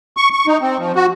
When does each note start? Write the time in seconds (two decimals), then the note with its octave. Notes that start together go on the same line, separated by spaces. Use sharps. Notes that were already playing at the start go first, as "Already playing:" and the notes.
0.17 C#6
0.33 C#6
0.47 D#4
0.61 C4
0.79 F3
0.95 F#4